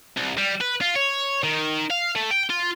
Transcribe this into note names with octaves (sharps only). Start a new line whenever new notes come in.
C2
G3
B4
F4
C#5
D#3
F5
A3
G5
F4